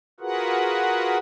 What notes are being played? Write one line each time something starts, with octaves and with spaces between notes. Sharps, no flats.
F4 F#4 G#4 A#4 B4 F#5